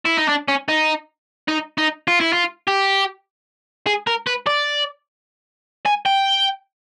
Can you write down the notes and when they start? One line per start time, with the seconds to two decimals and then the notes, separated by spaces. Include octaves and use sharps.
0.06 E4
0.18 D#4
0.29 D4
0.48 C#4
0.68 D#4
1.48 D#4
1.78 D#4
2.08 F4
2.20 E4
2.33 F4
2.68 G4
3.86 G#4
4.07 A#4
4.27 B4
4.47 D5
5.86 G#5
6.06 G5